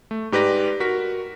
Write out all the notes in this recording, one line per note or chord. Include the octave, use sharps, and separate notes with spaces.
A3
G#2 G4 B4 D5 A#6
F#4 A#4 B6